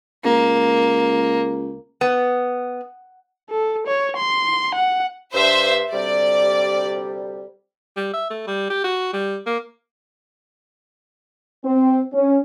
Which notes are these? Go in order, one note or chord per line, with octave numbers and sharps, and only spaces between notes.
C#2 A#3
B3
A4
C#5
C6
F#5
G2 C5 E5
D2 C3 G3 D5
G3
E5
A3
G3
G4
F#4
G3
A#3
C4
C#4